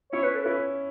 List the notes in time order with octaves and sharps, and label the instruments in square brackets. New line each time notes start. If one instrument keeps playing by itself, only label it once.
[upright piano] C#4 E4 [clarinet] C#5
[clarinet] B4
A4
[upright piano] C#4 E4 [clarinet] B4